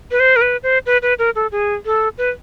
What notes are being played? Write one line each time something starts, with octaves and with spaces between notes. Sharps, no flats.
B4
C5
A#4
B4
C5
B4
B4
A#4
A4
G#4
A4
B4